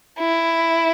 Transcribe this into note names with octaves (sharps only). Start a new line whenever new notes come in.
E4